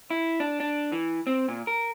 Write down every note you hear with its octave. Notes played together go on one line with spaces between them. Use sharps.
E4
D4
D4
E3
C4
A#2
A#4